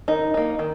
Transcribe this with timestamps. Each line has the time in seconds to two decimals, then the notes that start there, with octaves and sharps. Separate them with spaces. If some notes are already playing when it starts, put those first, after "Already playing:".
0.08 D#3 D#4
0.34 A#3 D#4
0.59 D#3